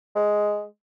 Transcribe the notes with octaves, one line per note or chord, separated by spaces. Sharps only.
G#3